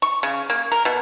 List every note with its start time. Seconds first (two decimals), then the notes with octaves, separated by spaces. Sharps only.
0.02 C#6
0.23 C#3
0.50 A#3
0.72 A#4
0.85 B2